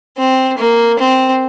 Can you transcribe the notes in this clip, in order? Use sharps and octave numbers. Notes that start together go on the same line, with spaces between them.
C4
A#3
C4